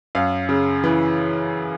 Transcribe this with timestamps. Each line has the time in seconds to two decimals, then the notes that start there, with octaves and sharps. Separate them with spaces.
0.15 F#2 F5
0.49 C#3
0.84 E3